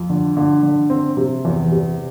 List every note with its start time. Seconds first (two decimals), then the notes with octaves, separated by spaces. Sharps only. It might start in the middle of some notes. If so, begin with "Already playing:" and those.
Already playing: F2
0.10 D3
0.37 D3
0.63 D3
0.90 C4
1.17 C3
1.45 E2
1.71 C3